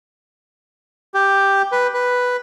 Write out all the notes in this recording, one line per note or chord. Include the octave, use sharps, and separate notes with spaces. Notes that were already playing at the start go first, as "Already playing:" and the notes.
G4
B4
B4